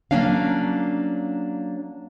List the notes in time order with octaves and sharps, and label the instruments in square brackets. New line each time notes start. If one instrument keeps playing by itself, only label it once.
[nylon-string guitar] F#3 G#3 A#3 C#4 D4 F5